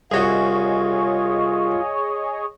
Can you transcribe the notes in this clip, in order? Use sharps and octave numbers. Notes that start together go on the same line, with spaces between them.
C2 F4 F#4 G#4 C#5 D#5